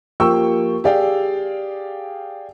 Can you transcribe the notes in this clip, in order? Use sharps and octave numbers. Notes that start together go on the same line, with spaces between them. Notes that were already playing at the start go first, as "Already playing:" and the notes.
F3 A#3 G4 G5 C#6 E6
G4 G#4 D5 F5 G5